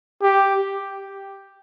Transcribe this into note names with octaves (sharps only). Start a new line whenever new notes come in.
G4